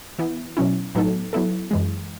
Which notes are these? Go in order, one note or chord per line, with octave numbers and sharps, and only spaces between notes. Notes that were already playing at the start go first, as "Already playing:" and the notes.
E3 B3 E4
B2 F#3 C#4 E4
A2 F#3 B3 D#4 A4
F#3 B3 E4 A4
F#2 E3 G#3